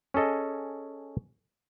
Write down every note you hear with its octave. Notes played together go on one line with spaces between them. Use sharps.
C#4 G#4 A4 D#5